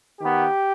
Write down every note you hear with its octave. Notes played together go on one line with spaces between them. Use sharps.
D#3 B3 G4